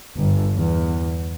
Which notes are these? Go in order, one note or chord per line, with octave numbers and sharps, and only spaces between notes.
G1
E2